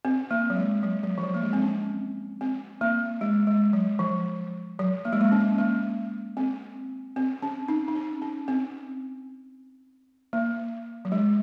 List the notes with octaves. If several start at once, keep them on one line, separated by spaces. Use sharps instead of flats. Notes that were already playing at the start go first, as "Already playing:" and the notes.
C4
A#3
F#3
G#3
F#3
F#3
F3
F#3
A#3
G#3
C4
C#4
C4
A#3
G#3
G#3
F#3
F3
F#3
A#3
G#3
A#3
C#4
A#3
C4
C4
C#4
D#4
D#4
C#4
C#4
C4
A#3
F#3
G#3